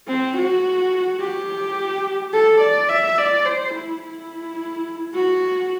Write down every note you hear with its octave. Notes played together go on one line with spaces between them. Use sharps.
C4
F#4
G4
A4
D5
E5
D5
C5
E4
E4
F#4